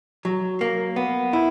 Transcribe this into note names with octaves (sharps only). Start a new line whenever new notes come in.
F#3
A#3
B3
E4